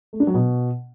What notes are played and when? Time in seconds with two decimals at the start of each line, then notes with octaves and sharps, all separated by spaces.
0.13 A3
0.20 D4
0.27 F#3
0.34 B2